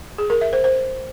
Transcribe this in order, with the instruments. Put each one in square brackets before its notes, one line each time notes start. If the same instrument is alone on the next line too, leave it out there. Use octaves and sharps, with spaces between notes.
[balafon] G#4
A#4
E5
C5
C5